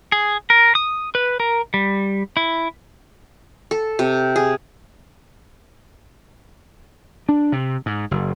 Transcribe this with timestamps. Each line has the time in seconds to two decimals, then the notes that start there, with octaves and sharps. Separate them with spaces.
0.12 G#4
0.50 A#4
0.75 D#6
1.15 B4
1.40 A#4
1.74 G3
2.37 E4
3.71 A4
3.99 C3
4.36 G#4
7.29 D4
7.52 C3
7.86 G#2
8.11 F#1